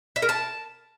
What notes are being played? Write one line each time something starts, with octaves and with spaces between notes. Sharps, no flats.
E5
A#4
A5